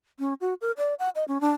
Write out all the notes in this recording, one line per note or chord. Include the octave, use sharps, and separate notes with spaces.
C#4
F#4
A#4
D5
F#5
D#5
C#4
D4